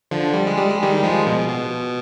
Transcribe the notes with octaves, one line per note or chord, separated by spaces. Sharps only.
D3 F3
G3
G#3
G3
G#3
D#3 G3
F3 G#3
B2
B2